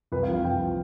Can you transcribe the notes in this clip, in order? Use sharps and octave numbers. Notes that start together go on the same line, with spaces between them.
C2 B4
F5
F3
F5
C2 G5
F3